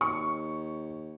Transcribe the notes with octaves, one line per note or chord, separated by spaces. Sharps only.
D#2 C#6